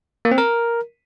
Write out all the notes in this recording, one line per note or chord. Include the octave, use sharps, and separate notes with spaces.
A#3
C4
A#4